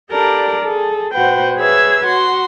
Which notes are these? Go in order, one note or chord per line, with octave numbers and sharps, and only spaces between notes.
D4 G4 A4 A#4 D5
G#4 A4
A#2 F#4 B4 C5 F#5 G5
G#4 B4 C#5 E5 E6 G#6
F#4 F#5 C6